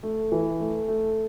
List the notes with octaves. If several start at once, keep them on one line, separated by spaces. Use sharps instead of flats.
A3
E3
A3
A3